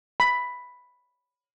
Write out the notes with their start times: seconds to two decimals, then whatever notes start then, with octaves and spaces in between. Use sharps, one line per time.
0.20 B5